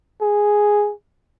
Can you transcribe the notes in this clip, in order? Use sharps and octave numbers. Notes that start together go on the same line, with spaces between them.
G#4